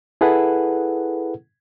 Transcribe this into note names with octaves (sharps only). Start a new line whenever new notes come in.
E4 G#4 A4 B4 F#5